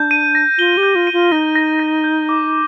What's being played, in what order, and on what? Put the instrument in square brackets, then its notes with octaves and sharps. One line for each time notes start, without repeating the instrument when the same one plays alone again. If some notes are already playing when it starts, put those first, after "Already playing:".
Already playing: [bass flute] D4 [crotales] G6
[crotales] D#7
A#6
[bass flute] F4 [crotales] G7
[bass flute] G4
[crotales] G6
[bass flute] F4
[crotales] D#7
[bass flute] F4
[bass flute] D#4 [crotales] A#6
[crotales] A#6
A#6
G6
D6